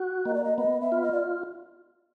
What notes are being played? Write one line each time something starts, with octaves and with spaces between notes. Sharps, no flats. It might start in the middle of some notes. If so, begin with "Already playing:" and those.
Already playing: F#4
A#3 D#5
D5
D#5
B3 D#5
E5
F4
D#5
D5